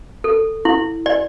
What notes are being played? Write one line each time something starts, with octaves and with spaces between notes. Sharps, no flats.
A4
E4
D5